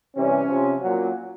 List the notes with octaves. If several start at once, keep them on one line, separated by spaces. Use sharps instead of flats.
C3 E3 G3 C#4
C3 F3
A#2 F#3